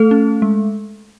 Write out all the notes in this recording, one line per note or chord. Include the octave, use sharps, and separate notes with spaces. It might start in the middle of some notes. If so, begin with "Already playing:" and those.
Already playing: A3 A4
C#4
G#3